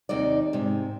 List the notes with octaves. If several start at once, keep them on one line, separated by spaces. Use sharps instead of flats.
D#2 C3 D#4 D5
G#2 C3